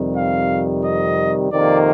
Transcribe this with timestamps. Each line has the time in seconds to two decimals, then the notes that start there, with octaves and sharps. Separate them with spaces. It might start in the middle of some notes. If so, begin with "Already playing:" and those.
Already playing: F2 C3 D#3 G3
0.14 F5
0.83 D#5
1.51 F2 C3 D#3 A#3 D5